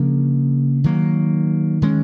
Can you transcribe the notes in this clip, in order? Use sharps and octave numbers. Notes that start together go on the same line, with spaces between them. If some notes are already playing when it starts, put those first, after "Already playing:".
Already playing: C#3 F3 A#3 D4
D#3 F#3 A#3
D#3 G#3 C#4